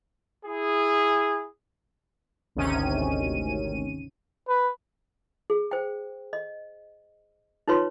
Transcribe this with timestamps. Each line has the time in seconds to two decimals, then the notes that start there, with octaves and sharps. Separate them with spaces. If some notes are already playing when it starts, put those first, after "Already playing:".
0.46 E4 G#4
2.55 G#1 D2 C3 D#3 C#4 D#7
4.48 B4
5.50 G#4
5.71 C5 G5
6.33 D#5
7.68 D#4 F4 B4 C#5 C6